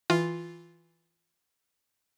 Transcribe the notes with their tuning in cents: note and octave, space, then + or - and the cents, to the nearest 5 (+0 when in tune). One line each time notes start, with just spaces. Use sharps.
E3 +0 F4 +0